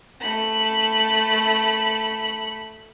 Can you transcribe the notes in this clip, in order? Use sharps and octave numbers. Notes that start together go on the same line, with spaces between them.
A3 B5